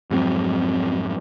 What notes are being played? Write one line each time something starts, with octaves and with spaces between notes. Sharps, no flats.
F2 G#2 F#3 C4